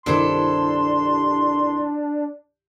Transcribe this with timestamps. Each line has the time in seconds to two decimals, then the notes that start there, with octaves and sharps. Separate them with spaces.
0.06 C2 G2 D#3 D4 E4 A4 C5 C6